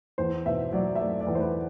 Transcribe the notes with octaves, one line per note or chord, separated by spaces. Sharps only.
E2 C5
B2 E5
F#3 D5
E5
A3 D5
D5
E2
C5
B4